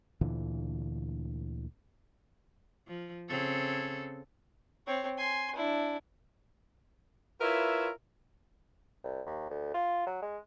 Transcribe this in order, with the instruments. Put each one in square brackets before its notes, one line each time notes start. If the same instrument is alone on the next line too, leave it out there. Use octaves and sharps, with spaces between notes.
[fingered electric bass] D2 A#2 D3 E3
[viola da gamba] F3
C#3 C4 A4
[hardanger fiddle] C4 C#5
G#5 C6
D4 E4
[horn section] E4 F4 A#4 B4 C#5 E5
[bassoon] C2
D#2
D2
F4
F#3
G#3